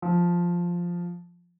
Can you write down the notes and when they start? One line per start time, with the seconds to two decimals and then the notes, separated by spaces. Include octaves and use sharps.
0.02 F3